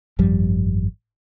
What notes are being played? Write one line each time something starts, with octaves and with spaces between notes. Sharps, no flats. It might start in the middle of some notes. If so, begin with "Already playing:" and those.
G#1 F#2 F3 G3